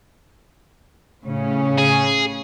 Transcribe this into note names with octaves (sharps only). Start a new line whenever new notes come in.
A2 C#3 C#4
G#4